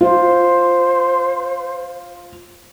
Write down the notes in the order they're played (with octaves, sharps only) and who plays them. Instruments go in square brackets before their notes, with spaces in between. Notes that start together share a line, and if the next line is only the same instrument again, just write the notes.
[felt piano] F4 [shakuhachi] C5